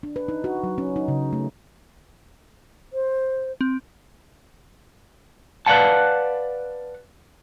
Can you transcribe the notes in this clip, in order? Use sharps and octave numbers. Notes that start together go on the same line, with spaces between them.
D4
B4
D#4
F#4
F#3
C#4
D#4
C#3
A3
C5
C4
B4 D5 F5 F#5 A5